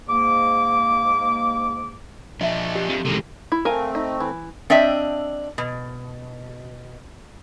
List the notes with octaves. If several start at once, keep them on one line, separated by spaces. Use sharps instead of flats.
G#2 A#3 D6
F3 D4 D#5 E5
G4
F2
C3 D#3 E3 G#3 A3
E4
A3 C4 A#4 F5 G#5
D#4
E3
C4 D4 D#5 E5 G5
B2